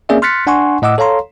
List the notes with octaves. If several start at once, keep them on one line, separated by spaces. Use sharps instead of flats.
A#3 C4 C#4 G#4 D5 E5
C6 F6 F#6 A6 B6 C#7
D4 F#5 G#5 C6 C#6
A2 D#5 F#5 D6 E6
A4 C#5 F5 A#5 C6